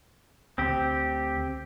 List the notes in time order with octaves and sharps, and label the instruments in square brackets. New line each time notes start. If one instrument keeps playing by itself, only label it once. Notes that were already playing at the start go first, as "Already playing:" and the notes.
[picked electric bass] D2 [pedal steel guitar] C4 G4